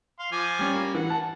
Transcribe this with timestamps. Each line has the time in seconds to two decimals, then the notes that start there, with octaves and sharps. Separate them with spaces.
0.20 F5 C6
0.32 F3 G#5 D6
0.59 G3 C#4
0.73 A#3
0.95 E3 F#5
1.10 A5